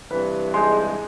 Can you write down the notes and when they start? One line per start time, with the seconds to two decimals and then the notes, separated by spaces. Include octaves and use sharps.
0.11 G2 C3 E3 B4
0.54 G#3 D#4 C6